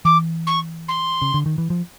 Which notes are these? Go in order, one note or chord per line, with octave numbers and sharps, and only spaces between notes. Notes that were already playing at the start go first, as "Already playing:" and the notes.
E3 D6
C#6
C6
C#3
D3
D#3
E3
F3